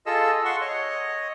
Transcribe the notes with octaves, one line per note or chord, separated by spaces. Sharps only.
F4 G#4 A4 D#5 E6
F#5 C6 C#6
C#5 D#5